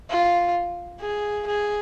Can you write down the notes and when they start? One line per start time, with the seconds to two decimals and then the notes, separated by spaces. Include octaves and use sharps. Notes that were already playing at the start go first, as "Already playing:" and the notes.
0.10 F4
1.01 G#4
1.47 G#4